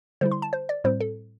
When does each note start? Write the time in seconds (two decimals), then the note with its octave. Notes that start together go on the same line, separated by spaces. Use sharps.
0.21 D3 G3 E4 C5
0.31 C6
0.42 A5
0.53 C5
0.69 D5
0.84 A2 G3 C4 C5
1.00 A4